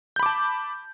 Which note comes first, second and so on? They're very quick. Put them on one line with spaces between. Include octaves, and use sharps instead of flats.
G6 B5 D6 A5